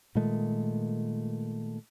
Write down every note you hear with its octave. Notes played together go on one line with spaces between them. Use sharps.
A#2 D#3 G#3 A3